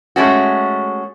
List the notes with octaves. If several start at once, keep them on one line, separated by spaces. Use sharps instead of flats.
G#3 A3 C#4 F#4